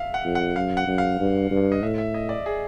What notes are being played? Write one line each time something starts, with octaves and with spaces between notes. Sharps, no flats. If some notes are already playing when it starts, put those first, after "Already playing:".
Already playing: E5 F5
F#5
F2
F#5
F#2 F5
F#5
F#2
F5
G2
G2
D#5
A2 E5
E5
D#5
D5
G#4